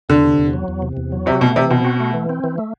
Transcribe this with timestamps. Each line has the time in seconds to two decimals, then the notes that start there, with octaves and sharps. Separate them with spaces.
0.09 E2 D3
0.24 C3
0.38 E2
0.53 F#3
0.68 E2
0.82 C3
0.97 E2
1.12 F#3
1.26 C3 F#4
1.41 B2 A3
1.56 C3 E3
1.70 B2 C4
1.85 F#4
2.00 A3
2.14 E3
2.29 C4
2.44 E3
2.58 A3